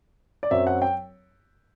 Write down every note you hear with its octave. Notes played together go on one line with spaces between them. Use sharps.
D5
F#2 F#3 C4 E5
F#5
G5